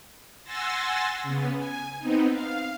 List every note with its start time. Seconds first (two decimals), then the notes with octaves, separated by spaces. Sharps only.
0.43 F#5 G#5 C6 E6 A6 A#6
1.23 C#3 B3
1.57 G#5
1.99 B3 C4 D#4
2.30 F5